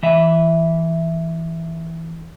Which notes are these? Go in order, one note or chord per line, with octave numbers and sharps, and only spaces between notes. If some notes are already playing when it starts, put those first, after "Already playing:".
E3 E5